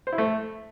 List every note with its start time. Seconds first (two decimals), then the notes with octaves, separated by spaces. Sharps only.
0.07 C5
0.13 E4
0.18 A3